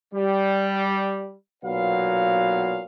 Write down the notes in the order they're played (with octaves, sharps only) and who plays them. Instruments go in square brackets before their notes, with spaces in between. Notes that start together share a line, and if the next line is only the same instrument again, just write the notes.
[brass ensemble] G3
B1 A#2 F#3 B3 F5